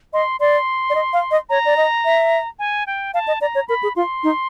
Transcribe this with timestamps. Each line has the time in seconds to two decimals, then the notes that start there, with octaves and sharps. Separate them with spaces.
0.13 D#5 C6
0.40 D5 C6
0.90 D5
0.95 D#5
1.13 F5
1.31 D#5
1.49 C#5 A#5
1.65 D5
1.77 D#5
2.05 E5
2.59 G#5
2.87 G5
3.14 F5 A5
3.27 D#5
3.41 D5 A#5
3.55 C#5
3.68 A#4 B5
3.83 G#4
3.96 F4 C6
4.23 D#4